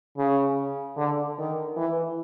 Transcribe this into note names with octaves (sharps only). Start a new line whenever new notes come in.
C#3
D3
D#3
E3